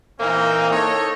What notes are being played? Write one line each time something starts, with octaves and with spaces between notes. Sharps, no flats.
A#2 E3 A#3 C4 D#4
D#4 A4 C#5